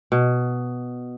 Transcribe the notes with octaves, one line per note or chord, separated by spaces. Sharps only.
B2